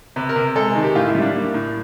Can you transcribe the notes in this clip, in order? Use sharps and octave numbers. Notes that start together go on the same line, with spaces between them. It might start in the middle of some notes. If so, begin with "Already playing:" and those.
C3 B4
A#4
C3
G#3 A4
G#4
D#3
G4
A2 F4
E4
G3
D4
A#3
A2